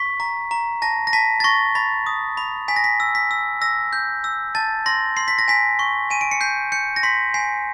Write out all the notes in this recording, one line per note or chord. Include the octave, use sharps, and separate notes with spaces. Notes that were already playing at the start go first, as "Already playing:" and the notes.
Already playing: C#6 B6
A#5
A#5
A5 A#6
A#6
A5 B6
A6
C#6 A#6
B5 A6
D#6
B5
G#5 B6
A#6
B6
E6
B6
E6
E6 A#6
G6
E6
A5 A6
C6 A#6
C6 C7
B6
A#6
G#5 B6
C#6
G#5 D#7
D7
C#7
G6 C7
G6 C#7
A#6
C6 B6
G#5 C7